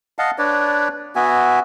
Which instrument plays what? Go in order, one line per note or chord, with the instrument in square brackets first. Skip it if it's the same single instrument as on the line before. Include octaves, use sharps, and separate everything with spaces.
[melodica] D#5 F5 F#5 A5
D4 B4 C#5 D5
B3 F#4 E5 G#5